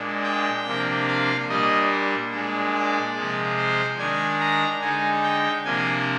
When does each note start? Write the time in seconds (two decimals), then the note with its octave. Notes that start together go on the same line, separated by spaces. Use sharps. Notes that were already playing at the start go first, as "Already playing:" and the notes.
Already playing: A#2 G#3 D4
0.24 G5
0.66 C3 F3 A#3 D4
1.08 F5
1.49 A#2 G3 D4 D#5
2.32 A#2 G#3 D4
2.74 D5
3.15 C3 F3 G#3
3.57 C5
3.98 D#3 G#3 D4 G#5
4.40 A#5
4.81 D3 G#3 D#4 G#5
5.23 G5
5.65 C3 F3 A#3 D4 G#5